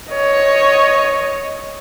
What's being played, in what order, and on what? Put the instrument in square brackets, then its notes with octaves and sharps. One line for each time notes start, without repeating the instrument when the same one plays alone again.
[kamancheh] C#5 D#5